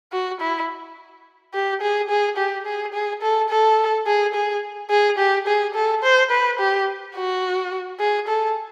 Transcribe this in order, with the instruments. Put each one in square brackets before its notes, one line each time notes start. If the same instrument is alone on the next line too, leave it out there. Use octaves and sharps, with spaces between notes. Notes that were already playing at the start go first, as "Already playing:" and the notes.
[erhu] F#4
E4
G4
G#4
G#4
G4
G#4
G#4
A4
A4
G#4
G#4
G#4
G4
G#4
A4
C5
B4
G4
F#4
G#4
A4